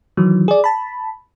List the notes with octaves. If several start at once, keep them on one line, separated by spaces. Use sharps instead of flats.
D#3 E3 F#3
G#4 D5
A5 B5